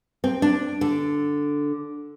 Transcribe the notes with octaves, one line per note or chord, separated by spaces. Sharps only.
C4
D4
D3